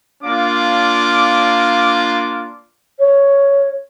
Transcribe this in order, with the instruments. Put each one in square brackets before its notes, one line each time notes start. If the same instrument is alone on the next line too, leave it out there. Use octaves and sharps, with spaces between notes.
[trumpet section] A#3 D4 F4 D6
[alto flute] C#5